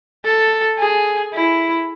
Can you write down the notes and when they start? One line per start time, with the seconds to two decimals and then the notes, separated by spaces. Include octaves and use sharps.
0.25 A4
0.79 G#4
1.34 E4